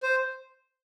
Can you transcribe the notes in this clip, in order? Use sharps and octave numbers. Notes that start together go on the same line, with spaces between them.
C5